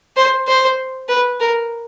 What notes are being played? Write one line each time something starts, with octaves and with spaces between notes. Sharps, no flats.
C5
C5
B4
A#4